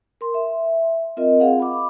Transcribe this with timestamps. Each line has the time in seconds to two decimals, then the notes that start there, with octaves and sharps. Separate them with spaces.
0.21 A#4 C6
0.34 E5
1.17 C4 F4 A#4 D#5
1.40 C4 G#4 F5 F#5
1.60 B5 D6